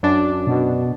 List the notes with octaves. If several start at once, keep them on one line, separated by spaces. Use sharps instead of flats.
F#2 D4
B2